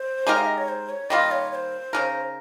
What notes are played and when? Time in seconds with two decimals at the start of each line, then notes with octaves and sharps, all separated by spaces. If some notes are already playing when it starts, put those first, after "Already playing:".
Already playing: C5
0.27 G#3 D#4 G4 A#4
0.37 F5
0.47 D#5
0.58 C#5
0.68 C5
0.89 C#5
1.10 D#3 G3 A#3 F4 D#5
1.31 C#5
1.51 C#5
1.55 C5
1.93 C#3 G#3 D#4 A#4